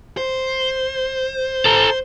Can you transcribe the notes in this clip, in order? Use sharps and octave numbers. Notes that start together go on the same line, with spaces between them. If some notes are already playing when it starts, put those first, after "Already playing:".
C5
A4 A#5